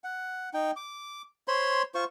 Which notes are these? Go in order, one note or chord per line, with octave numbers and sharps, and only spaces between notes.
F#5
D#4 G5
D6
C5 C#5 B5 C6
F4 C5 C#6